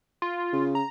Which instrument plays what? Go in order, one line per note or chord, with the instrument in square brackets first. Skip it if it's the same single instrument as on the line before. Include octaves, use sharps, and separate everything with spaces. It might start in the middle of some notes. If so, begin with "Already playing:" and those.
[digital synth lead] F4
[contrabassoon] C#3
[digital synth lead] A#5